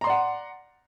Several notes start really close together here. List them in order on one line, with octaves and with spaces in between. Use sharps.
A#5 C6 D5 F#5